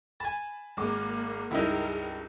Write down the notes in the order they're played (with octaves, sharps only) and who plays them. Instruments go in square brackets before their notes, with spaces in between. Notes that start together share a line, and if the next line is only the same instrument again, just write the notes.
[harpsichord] G#5 A5 [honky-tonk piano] B5
[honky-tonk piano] G#1 G#3 D6 [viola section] A#3
[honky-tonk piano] C#2 G2 [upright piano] D#4 E4 [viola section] G#4 A#4